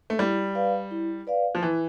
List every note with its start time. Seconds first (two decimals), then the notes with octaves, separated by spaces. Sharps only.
0.10 A3
0.19 G3 E4
0.55 B4 D5 F5
0.91 E4
1.27 B4 D5 F5
1.55 F3
1.63 E3 E4